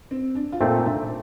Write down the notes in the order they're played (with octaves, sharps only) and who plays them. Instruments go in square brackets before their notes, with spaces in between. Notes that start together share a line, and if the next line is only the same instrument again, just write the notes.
[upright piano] C4
D4
F4
[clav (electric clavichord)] A#2 A3 C4 [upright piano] D#4
[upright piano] D4